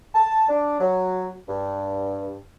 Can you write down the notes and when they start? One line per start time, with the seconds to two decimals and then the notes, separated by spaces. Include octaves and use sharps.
0.14 A5
0.49 D4
0.80 F#3
1.49 G2